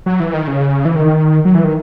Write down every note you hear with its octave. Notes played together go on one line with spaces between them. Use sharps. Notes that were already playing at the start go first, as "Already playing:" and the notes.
F#3
E3
D#3
C#3
E3
D#3
F#3
E3
D#3